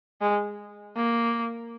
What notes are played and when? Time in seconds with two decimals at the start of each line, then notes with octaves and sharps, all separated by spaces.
0.21 G#3
0.96 A#3